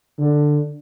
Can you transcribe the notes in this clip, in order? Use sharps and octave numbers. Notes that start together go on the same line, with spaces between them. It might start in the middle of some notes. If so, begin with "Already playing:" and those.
D3